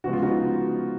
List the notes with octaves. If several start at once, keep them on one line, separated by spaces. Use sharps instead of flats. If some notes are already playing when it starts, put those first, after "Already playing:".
C#3 F3 G#3 B3 F#4
F4
D#4 F#4